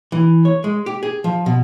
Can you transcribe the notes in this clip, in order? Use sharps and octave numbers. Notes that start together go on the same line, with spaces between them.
E3
C#5
G#3
G4
G#4
F3
B2